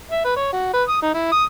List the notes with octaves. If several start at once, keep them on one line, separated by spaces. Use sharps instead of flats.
E5
B4
C#5
F#4
B4
D#6
D#4
E4
D#6